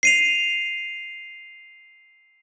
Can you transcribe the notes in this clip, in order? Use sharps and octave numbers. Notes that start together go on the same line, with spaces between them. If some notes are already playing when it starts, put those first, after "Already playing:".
C7 D#7 F7